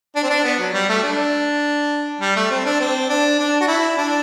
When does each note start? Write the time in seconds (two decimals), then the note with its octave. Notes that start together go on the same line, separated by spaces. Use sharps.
0.16 D4
0.23 C4
0.30 D4
0.44 B3
0.59 F#3
0.73 G3
0.89 A3
1.03 D4
2.20 G3
2.36 A3
2.50 C4
2.65 D4
2.80 C4
3.10 D4
3.39 D4
3.61 F#4
3.68 E4
3.97 D4